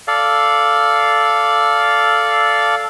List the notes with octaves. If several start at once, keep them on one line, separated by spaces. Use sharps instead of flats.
A4 D5 F5